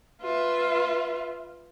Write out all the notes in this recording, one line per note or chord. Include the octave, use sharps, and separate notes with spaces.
F4 B4 E5